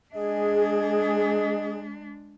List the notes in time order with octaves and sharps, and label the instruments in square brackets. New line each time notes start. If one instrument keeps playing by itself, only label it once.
[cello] G#3 D4 [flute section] G#4 [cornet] D#5